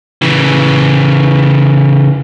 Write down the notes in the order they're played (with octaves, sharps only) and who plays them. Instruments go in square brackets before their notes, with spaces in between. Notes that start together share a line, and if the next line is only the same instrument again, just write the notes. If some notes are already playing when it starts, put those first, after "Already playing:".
[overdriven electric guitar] C#3 E3